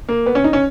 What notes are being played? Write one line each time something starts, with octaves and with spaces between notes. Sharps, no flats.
A#3
B3
C#4
D#4
C#4